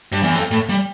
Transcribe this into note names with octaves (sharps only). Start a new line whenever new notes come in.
G2
E2
F2
A2
G3